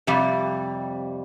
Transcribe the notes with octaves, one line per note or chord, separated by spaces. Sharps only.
F2 C3 G3